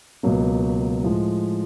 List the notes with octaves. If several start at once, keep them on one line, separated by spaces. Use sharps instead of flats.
C#2 B2 F#3 A#3
A2 F3 G#3